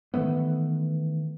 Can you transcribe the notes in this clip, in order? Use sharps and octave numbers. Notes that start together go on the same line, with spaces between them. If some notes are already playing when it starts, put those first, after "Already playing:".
D#3 E3 A3 B3